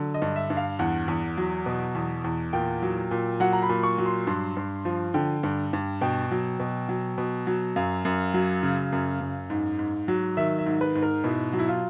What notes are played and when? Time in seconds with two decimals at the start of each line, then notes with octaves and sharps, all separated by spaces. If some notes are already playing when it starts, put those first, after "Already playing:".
Already playing: D3 F#3
0.14 D#5
0.22 G2
0.36 E5
0.50 G2
0.57 F5
0.79 E2 F#5
1.08 E2
1.37 F#3
1.66 B2
1.95 E2
2.24 E2
2.53 A#2 G5
2.82 F#3
3.11 A#2
3.40 F#3 F#5
3.53 A#5
3.62 B5
3.69 A#2
3.83 C#6
3.98 F#3
4.06 C6
4.27 G2 C6
4.57 G2
4.85 F3
5.14 D3 G5
5.43 G2
5.73 G2
6.01 B2 G5
6.31 F#3
6.60 B2
6.89 F#3
7.18 B2
7.47 F#3
7.76 F#2 F5
8.05 F#2
8.34 F#3
8.63 C#3
8.92 F#2
9.21 F#2
9.50 G#2
9.79 G#2
10.08 F#3
10.37 D#3 E5
10.59 E5
10.66 G#2
10.81 B4
10.95 G#2
11.03 A#4
11.24 B2 E4
11.53 F#3
11.59 E4
11.68 F4